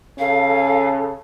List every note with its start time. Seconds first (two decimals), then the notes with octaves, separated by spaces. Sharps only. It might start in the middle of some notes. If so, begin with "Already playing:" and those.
0.19 C#3 C#4 A4 F5